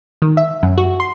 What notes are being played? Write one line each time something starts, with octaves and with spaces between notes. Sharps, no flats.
D#3
E5
F#2
F#4
C6